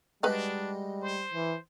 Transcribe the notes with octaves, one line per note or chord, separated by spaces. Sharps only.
G3 G#3 D4 D#4 F#4 B4 F5
C5
E3